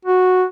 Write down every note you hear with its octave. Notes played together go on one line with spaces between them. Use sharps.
F#4